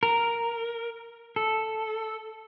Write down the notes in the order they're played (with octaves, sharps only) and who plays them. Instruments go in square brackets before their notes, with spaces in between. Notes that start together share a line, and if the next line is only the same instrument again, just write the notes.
[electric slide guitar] A#4
A4